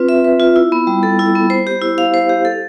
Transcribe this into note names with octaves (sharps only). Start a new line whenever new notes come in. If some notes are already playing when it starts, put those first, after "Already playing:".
Already playing: C4 F4 B4
E5
B4
F4
E4
B3
G3
A4
E4
B3
C5
G4
E4
F5
C5
G4
A4